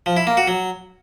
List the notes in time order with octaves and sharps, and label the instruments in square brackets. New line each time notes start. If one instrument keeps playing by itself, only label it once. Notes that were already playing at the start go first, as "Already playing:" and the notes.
[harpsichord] F3
E4
A#3
F#4
F#3